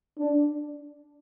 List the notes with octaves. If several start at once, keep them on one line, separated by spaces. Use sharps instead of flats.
D4